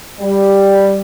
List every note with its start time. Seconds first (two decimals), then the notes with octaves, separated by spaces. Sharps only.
0.20 G3